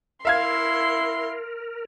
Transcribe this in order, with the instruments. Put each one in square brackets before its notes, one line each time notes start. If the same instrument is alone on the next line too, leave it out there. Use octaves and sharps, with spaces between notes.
[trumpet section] E4 [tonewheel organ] A#4 [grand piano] E5 F5 G#6 [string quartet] C6